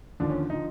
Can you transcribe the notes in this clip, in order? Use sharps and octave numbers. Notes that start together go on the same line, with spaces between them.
D#2 D3 F3 D4
C#4
D3 F3 D#4